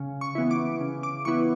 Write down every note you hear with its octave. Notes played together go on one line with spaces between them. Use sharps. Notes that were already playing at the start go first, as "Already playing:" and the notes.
Already playing: C#3
C#6
E3 B3 E4
D6
C#3
D6
E3 B3 E4 C#6